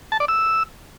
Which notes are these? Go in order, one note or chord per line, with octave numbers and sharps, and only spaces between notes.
A5
D5
E6